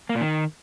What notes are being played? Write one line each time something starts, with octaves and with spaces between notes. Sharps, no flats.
A#3
A#2
D#3